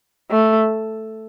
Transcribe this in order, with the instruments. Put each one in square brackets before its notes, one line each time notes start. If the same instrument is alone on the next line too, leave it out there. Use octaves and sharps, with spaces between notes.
[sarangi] A3